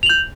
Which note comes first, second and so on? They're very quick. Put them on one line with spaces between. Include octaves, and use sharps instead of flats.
F7 F#7 G6